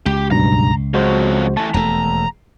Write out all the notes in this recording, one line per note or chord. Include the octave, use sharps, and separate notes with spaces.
C#2 G4
B1 G2 B2 A#5
F2 F#3 G#3 F#4 C5
E3 A3 A5
E1 D#2 A3 A#5